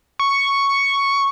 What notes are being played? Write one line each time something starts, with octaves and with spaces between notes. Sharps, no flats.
C#6